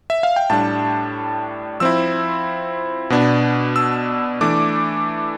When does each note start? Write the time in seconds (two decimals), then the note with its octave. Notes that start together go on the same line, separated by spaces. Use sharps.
0.10 E5
0.23 F5
0.36 G5
0.50 A2 G3 D4 A5
1.80 F3 C4 E4 E6
3.10 B2 B3 D4
3.76 E6
4.41 E3 A3 D4 D6